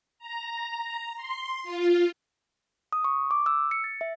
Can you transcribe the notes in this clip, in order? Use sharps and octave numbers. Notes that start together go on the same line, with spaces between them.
A#5
C6
F4
D#6
C#6
D6
E6
C#7
A6
E5